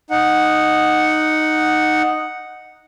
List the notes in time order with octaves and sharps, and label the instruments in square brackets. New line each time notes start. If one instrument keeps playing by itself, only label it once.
[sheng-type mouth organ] D#4 F#5